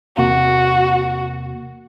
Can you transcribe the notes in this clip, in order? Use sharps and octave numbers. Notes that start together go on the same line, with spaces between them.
E2 C3 A#3 F#4